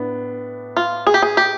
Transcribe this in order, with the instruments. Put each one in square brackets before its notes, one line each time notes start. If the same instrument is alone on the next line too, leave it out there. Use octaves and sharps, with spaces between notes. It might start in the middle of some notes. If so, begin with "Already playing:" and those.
Already playing: [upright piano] A2 B3 D4
[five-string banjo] F4
G#4
G4
G#4
G4